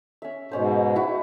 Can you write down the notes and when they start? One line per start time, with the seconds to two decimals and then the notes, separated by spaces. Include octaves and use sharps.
0.22 C#4 E5
0.51 G#2 B2 G#3 C#4 C5
0.96 E4 F#4